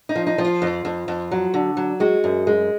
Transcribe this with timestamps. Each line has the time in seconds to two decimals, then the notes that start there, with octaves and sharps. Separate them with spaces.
0.09 D#4
0.15 F3
0.27 D#4
0.38 F3
0.45 F4
0.62 F2
0.85 F2
1.08 F2
1.32 F#3
1.54 D3
1.77 F#3
2.00 G#3 F#4
2.24 F#2
2.47 G#3